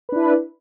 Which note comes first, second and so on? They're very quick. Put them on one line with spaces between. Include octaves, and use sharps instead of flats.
B4 D4 E4